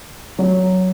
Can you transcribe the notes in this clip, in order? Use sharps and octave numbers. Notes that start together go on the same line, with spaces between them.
F#3